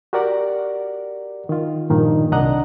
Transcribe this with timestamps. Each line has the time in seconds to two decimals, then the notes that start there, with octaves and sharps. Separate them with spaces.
0.13 F#4 G4 A#4 D5 F#5
1.49 D#3 F4
1.90 G2 A#2 D#3 F3
2.32 C2 D4 D#5 F#5 A#5 F#6